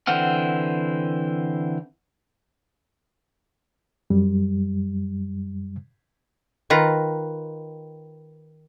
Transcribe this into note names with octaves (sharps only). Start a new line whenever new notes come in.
D3 E3 C4 F#5 F6
F#2 G3
D#3 F4 B4 A#5